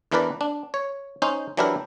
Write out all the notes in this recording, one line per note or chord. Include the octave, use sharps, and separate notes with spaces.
E2 E3 D4 A#4 B4 D5
D4
C#5
C#4 D#4 C5
E3 F#3 D4 E4 G4 A#4